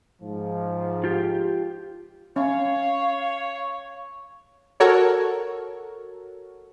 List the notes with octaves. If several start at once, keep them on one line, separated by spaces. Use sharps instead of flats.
G#2 F3
F4 G4
C#4 C#5 F5
F#4 A4 A#4 C#5